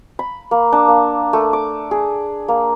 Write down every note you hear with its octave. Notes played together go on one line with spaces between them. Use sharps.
B5
A#3
D4
A#3
A3
D6
G#4
A#3